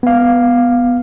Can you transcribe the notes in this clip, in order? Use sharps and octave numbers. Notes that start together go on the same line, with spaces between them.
B3 F5